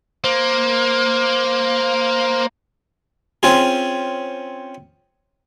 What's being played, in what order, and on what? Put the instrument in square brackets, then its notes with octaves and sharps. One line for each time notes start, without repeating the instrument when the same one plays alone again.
[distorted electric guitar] A#3 [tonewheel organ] C5
[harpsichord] C4 C#4 F4 G#4